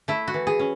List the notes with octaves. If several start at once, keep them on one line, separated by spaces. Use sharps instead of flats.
A3 E4
F#4
E3
G#4
C#4